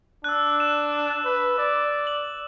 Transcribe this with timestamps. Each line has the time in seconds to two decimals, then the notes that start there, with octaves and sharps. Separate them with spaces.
0.24 D4 E6 F#6
0.60 E7
1.25 B4
1.58 D5
2.07 F#7